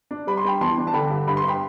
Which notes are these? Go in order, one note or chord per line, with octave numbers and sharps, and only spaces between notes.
D4
G3 B5
C6
G3 G5 B5
E2 A5 C6
D4
A5
D3 G5 B5
G2
G2 B5
C6
G2 G5 B5